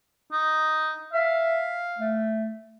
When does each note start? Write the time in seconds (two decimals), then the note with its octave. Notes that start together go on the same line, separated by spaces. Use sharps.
0.32 D#4
1.13 E5 F5
1.98 A3